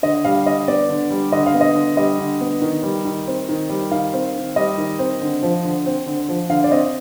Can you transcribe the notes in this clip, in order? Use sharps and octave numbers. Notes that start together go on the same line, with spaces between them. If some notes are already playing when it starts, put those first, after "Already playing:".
D3 D#5
G3 F5
D3 D#5
B3 D5
D3
G3
D3 D#5
F5
B3
D#5
D3
G3 D#5
D3
B3
D#3
G3
D#3
C4
D#3
G3
D#3 F5
C4
D#3
G3 D#5
D#3
C4
D3
F3
D3
C4
D3
F3
D3 F5
D5
C4 D#5